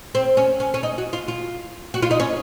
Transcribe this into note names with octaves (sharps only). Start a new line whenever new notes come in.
C4
C#4
C#4
C#4
D#4
F#4
F4
F4
F#4
F4
D#4
C#4